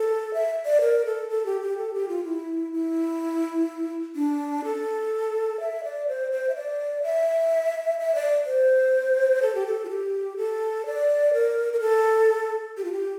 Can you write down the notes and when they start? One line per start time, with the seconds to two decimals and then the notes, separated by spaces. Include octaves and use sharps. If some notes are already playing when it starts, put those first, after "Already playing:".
Already playing: A4
0.34 E5
0.65 D5
0.81 A#4
1.06 A4
1.29 A4
1.46 G4
1.62 G4
1.78 A4
1.94 G4
2.08 F4
2.24 E4
2.73 E4
4.16 D4
4.65 A4
5.60 E5
5.84 D5
6.08 C5
6.31 C5
6.49 E5
6.55 D5
7.03 E5
7.99 E5
8.15 D5
8.46 C5
9.42 A4
9.55 G4
9.67 A4
9.85 F4
9.89 G4
10.37 A4
10.86 D5
11.33 A#4
11.73 A#4
11.80 A4
12.77 G4
12.84 F4
12.93 G4